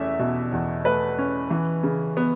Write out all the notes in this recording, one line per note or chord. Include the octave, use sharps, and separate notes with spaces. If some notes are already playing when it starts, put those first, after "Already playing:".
Already playing: E2 A3 C#4 E5
B2
E2
A3 B4
C#4
E3
C#3
B3